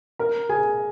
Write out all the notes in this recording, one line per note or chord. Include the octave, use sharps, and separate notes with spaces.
A#4 A#5
G#4 G#5